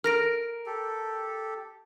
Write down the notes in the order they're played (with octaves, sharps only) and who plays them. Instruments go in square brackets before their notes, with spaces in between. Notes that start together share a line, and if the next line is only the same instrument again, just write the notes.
[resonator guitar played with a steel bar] A#4 [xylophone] F6 A#6 D7
[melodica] G4 A4